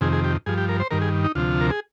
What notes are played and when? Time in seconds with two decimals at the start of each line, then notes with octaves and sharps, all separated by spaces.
0.01 F2 C3 D#3 G#4
0.13 G#4
0.24 G4
0.46 G2 F3 G#4
0.58 G4
0.69 A#4
0.80 C5
0.91 G2 D#3 A#4
1.02 G#4
1.24 D#4
1.35 D2 C3 F3 F4
1.61 A#4
1.70 G#4